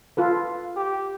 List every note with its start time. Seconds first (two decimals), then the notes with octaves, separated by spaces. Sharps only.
0.17 F4 A4 B4
0.77 G4